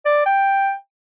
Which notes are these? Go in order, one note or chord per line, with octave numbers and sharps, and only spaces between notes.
D5
G5